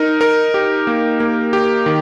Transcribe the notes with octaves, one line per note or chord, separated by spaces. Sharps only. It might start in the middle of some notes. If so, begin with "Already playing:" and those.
Already playing: D#4 A#4
A#4
G4
A#3
A#3
G4
D#3